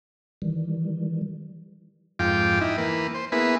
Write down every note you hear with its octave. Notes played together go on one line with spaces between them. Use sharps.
D#3 E3 G3
F2 G#2 F4 G5 D6
D#4 E4
E3 A#3 B4
C5
A#3 B3 E4 G#4 B4